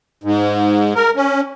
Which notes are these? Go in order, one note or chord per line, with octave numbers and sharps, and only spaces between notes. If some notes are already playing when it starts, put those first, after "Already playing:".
G#2
A#4
C#4